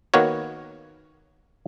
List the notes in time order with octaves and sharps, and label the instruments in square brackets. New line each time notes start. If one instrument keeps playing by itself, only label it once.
[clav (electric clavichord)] D#3 A#3 B3 F#4 A#4 C#5